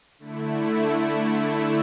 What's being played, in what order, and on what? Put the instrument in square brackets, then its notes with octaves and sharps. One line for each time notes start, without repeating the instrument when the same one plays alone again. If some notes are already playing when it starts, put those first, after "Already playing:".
[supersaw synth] D3 A3 E4